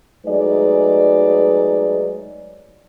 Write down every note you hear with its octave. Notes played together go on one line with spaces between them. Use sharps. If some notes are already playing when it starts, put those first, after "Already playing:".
F#3 G#3 A3 D#4 B4 D5